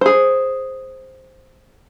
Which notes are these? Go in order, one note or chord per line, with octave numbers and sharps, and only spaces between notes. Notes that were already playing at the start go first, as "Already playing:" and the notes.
G#4 C5